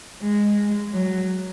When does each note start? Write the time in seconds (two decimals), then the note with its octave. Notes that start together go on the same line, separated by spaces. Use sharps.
0.22 G#3
0.93 F#3